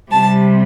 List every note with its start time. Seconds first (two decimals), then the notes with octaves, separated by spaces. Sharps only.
0.11 C3 G3 A5